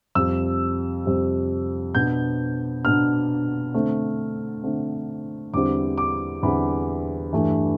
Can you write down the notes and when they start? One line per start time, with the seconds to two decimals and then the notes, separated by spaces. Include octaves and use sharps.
0.15 F2 C3 G3 E6
1.05 F2 C3 G3
1.95 B2 B3 D4 G6
2.84 B2 B3 D4 F6
3.74 D3 A3 C4
4.64 D3 A3 C4
5.53 E2 D3 G3 C4 E4 D6
5.98 D6
6.43 E2 D3 G3 C4 E4 B5
7.33 G2 E3 A3